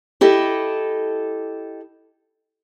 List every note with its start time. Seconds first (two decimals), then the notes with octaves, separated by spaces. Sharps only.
0.21 E4 G4 A4 D#5